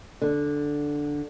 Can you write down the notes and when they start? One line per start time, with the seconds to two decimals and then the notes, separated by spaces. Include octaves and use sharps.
0.21 D3